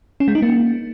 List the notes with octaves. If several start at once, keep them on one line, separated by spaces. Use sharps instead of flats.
C#4
G#3
D#4
A#3